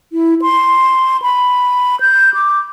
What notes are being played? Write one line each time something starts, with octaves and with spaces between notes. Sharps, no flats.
E4
C6
B5
G6
D6